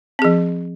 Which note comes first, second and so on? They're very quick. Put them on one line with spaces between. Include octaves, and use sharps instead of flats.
C4 G#4 F3